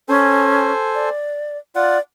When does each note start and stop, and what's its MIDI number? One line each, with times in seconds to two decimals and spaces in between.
0.09 0.71 61
0.09 1.09 69
0.09 1.09 72
0.09 1.09 80
0.95 1.58 74
1.75 1.98 65
1.75 1.99 74
1.75 1.98 78